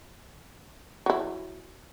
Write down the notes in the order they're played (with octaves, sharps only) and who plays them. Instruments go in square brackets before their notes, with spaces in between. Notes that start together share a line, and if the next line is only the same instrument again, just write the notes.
[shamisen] F#3 E4